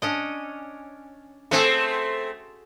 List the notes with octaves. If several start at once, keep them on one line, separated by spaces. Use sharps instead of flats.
C#4 D4 D#5
A3 C4 F#4 G#4 A4